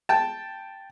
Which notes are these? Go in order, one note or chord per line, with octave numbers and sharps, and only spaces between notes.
G5 A5